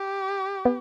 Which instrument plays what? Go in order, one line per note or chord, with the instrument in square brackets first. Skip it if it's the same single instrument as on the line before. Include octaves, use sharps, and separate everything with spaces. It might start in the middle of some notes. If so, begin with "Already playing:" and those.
Already playing: [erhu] G4
[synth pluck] B3